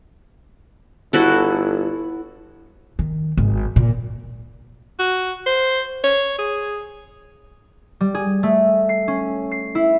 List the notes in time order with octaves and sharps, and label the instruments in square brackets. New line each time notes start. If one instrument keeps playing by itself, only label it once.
[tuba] G1 [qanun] E4 F#4 A4
[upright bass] D#3
G#1
A#2
[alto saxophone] F#4
C5
C#5
G#4
[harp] G3
G#4
A3
C7
C#4
C7
E4